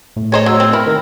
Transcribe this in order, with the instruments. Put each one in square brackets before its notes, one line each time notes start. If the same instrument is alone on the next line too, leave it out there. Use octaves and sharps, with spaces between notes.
[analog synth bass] A2
[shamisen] G#4 C5 D#5 [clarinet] C#5
[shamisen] F#3 [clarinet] E6
[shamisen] C4
[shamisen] E4 B4 [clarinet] A#4
[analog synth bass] D#3 [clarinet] A#4